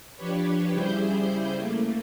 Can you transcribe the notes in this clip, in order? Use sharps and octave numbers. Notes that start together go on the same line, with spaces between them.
F3 D4 G4 B4 C#5
C#3 G3 E4 G#4 C5 G6
A3 A#3